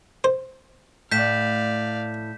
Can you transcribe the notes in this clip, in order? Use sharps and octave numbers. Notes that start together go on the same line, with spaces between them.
C5
A2 D5 F5 G6 B6 E7